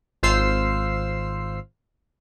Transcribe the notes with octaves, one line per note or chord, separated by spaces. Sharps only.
G#1 F4 C5 F5 E6 C7